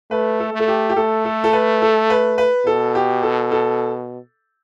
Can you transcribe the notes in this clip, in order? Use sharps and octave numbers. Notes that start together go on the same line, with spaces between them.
A3 B4
A4
A3
A4
G4
G4
A3 A4
A4
A4
B4
A4
B4
B4
B2 A4
G4
A4
A4